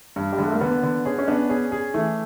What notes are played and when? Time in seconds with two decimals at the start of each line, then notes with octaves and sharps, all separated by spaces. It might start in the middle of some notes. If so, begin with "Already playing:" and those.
0.16 G2
0.32 G3
0.38 D3 G#3
0.47 A3
0.53 A#3
0.61 D3 B3
0.83 D3
1.05 C#4 G#4
1.18 C#4
1.28 B3 D4
1.49 C#4 G#4
1.72 G#4
1.94 E3 A3